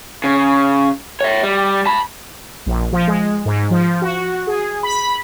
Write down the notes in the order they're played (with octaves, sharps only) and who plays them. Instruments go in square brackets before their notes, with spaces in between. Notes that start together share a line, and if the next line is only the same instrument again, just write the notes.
[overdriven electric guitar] C#3
C#5 E5
G3
A5 B5
[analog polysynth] A#1
F3
G#3
G#2
F3
F#4
G#4
B5